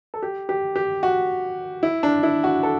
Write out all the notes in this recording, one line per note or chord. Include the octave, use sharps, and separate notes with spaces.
A4
G4
G4
G4
F#4
E4
D4
E4
F#4
A4